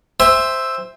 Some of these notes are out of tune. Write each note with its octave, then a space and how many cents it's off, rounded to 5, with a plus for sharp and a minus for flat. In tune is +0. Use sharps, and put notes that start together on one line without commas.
C5 +0 E5 +0 G5 +45